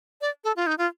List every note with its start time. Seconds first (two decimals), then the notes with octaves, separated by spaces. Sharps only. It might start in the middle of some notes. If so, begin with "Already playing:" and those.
0.21 D5
0.44 A4
0.56 F4
0.67 D#4
0.78 F4